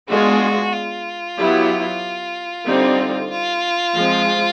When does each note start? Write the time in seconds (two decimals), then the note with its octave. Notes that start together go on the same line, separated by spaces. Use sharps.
0.09 G#3 B3 D4 F4 F#4 G#4
0.73 F4
1.38 F#3 B3 E4 G4
2.66 D3 G3 C4 D#4
3.30 F4
3.94 F3 G#3 C4